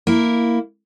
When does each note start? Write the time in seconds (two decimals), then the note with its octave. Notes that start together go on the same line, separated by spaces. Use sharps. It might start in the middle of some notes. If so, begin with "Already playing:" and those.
0.07 A#3 E4